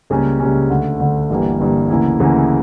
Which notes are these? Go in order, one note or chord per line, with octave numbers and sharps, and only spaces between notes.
C#2 C#3 G3 A#3 C#4
C#2 C#3 G3 A#3 C#4
D2 D3 A3
D2 D3 A3
G1 G2 E3 G3 A#3
G1 G2 E3 G3 A#3
D2 C#3 E3 A#3 E4
D2 C#3 E3 A#3 E4